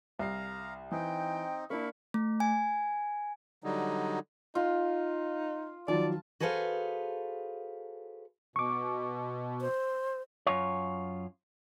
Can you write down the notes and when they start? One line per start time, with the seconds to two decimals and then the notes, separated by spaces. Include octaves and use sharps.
0.19 C2 F5 A#5 C7
0.91 E3 C4 D#4 G5
1.70 A#3 D4 E4 F5 B5 C#6
2.14 A3
2.40 G#5
3.64 D3 F#3 G3 D#4
4.55 D#4 F4
5.88 D#3 F3 F#3 D5 A5
6.40 F#4 G#4 A4 B4 C5 F5
8.56 B2 C#6 D6
9.61 C5
10.47 F#2 F4 C#5